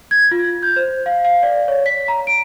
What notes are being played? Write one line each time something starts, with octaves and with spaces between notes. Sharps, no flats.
G#6
F4
G6
C5
F5
F5
D5
C#5
B6
A#5
D7